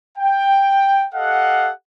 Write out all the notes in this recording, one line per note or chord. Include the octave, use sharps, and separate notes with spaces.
G5
G4 A4 D#5 F5 F#5